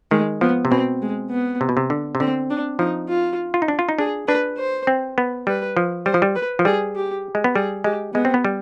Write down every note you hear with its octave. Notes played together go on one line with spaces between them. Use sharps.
D#3 G#3
F3 B3
C3
B2 C4
G#3
B3
C3
B2
C3
D3
C3
D3 C4
D4
F3 D#4
F4
F4
D#4
D4
F4
D#4
D4 G#4
D4 B4
C5
C4
B3
G3 B4
F3
G3 C5
F3
G3
B4
F3
G3 G#4
G4
G#3
B3
G3 G#4
G#3 G4
G#3 B3
C4
B3
G3